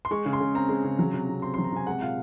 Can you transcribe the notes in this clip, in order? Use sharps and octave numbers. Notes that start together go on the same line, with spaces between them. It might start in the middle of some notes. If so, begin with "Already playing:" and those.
C6
G#3 C#6
C#3
C6
C#3
C4 A#5
G#3
C#3
F#3
C3
C3
C4 C6
F#3 C6
A#5
C3 G#5
G#3 F#5
A#2 F5